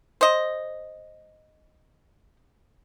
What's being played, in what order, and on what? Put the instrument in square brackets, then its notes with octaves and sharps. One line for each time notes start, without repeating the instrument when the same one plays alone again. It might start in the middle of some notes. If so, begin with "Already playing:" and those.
[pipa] C5 D#5